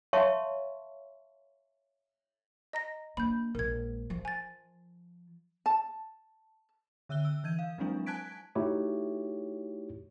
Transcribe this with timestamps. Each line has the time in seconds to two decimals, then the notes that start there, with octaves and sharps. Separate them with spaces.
0.13 C#5 E5 F5 A5 C6 C#6
2.73 D#5 A#5 A#6
3.17 A#3 D4 B5 G6
3.55 A#1 G#3 A#4 G#6
4.10 F3
4.25 G#5 A6
5.66 A5
7.09 D3 E5 E6 F#6 G7
7.25 E6
7.44 E3 G6 G#6 D#7
7.59 F5
7.78 F3 F#3 G#3 C4 D4 E4
8.06 G#5 A5 F#6 G#6 B6 D7
8.55 A3 D#4 E4 F#4 G4 C#5